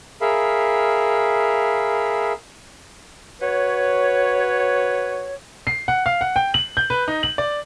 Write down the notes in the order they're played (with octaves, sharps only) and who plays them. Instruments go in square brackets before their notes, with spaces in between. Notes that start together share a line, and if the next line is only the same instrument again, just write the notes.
[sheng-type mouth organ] G#4 A#4 E5 F5 B5
[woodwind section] F#4 B4 C#5
[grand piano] C7
F#5
F5
F#5
G5
F#7
G6
B4
D#4
F#7
D5